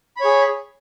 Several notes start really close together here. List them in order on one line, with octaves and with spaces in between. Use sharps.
B5 C#5 G#4